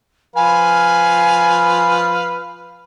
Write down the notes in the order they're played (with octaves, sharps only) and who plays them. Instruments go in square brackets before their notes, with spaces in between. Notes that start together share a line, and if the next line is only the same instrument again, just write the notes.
[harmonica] F3 B4 F5 [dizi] G#5